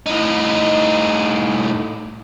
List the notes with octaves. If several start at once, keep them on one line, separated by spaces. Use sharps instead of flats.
A2 D#4